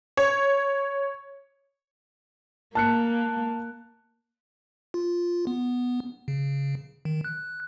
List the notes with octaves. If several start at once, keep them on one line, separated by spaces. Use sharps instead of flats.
C#5
A#3 A5 F#6 C#7
F4
B3
C#3
D#3
F#6